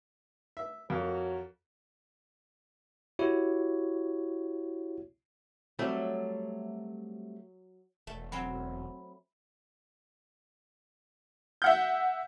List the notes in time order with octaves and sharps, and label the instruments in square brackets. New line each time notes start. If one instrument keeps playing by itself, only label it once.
[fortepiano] E5
[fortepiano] F2 [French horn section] F#4 A#4 C#5
[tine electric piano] E4 F#4 G4 C#5
[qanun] F#3 [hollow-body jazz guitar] G3 A3 C4
[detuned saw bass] E1 [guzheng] A3
[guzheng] F#3 C4 [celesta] B5
[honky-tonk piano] E5 F#5 G6